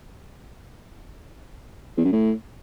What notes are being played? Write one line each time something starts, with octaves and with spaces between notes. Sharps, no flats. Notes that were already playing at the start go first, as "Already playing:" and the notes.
E2
F#2
A2